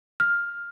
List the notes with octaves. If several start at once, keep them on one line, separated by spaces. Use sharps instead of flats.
F6